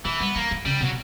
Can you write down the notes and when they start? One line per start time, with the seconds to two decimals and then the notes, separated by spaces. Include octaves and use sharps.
0.05 D3 E3
0.20 G3 B3
0.35 E3 A#3
0.51 E3
0.65 C#3 G3
0.81 B2 F#3